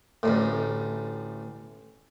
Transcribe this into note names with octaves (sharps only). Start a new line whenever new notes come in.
A1 D2 A2